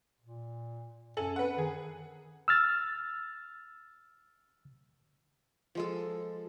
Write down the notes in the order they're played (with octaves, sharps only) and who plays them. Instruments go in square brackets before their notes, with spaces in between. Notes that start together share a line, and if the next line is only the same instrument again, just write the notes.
[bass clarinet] A#2
[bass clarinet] F#2 [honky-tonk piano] A4 G#5 F#7
[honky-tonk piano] B4 F#5
[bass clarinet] D#3 [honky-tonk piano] G#4
[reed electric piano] E6 F6 A6
[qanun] F3 G#3 A4